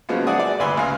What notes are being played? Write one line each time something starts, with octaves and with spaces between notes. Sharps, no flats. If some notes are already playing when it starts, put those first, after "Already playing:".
C#3 F3 F#3 G#3 A#3 B3
F#4 G#4 D5 F#5 G#5 D#6
D5
D2 G2 B4 G#5 C6 E6
C#2 F5 F6